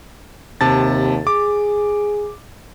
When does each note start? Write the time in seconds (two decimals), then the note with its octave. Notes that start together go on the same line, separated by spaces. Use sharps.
0.61 D#2 C3 A5 A6
1.27 G#4 D6